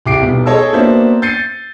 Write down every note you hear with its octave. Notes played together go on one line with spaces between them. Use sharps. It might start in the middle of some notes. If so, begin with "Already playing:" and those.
C2 G4 D6 C7 D7
B1 G3 B3
G#4 A4 C#5 D#5 A5 E6
A#3 B3 D4 F#4 C5 E5
G6 A6 C7 C#7 D#7